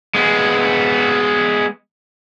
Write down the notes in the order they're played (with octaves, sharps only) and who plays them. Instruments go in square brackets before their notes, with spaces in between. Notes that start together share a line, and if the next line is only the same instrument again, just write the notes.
[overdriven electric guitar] G#3 B3